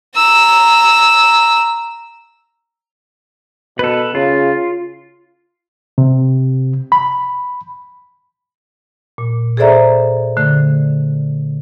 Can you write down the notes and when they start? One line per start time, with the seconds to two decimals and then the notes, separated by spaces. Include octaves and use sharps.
0.16 A#5 E6
3.79 B2 A4 B4
4.15 C#3 F4
5.98 C3
6.92 B5
9.18 A#2
9.57 G#4 A4 C5 D5 E5 A#5
10.37 D3 A3